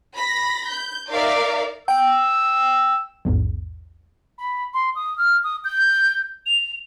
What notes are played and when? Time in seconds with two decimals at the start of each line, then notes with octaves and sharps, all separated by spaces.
0.17 B5 A#6
0.70 G6
1.10 D#4 A#4 D5 E5 F5
1.88 G5 E6
3.25 A#1 E2 G#2
4.38 B5
4.74 C6
4.95 D#6
5.18 F6
5.44 D#6
5.65 G6
6.46 F7